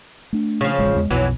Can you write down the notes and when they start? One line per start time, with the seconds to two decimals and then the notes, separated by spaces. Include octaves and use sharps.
0.33 A3 D4
0.61 C#3 F3
0.78 E1 A1 G#3
0.96 E2 G#3
1.10 B1 F2 B2 E3 F#3